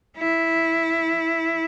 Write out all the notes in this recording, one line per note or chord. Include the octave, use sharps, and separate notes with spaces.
E4